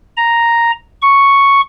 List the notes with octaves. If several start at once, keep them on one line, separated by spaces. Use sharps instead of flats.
A#5
C#6